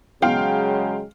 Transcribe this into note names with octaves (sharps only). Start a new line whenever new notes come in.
E2 C#3 F#3 G#3 F5 G5 C6